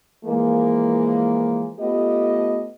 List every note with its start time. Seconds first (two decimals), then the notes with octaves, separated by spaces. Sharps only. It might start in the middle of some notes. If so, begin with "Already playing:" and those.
0.25 E3 F3 G#3 A#3
1.79 A3 B3 F4 G4 D#5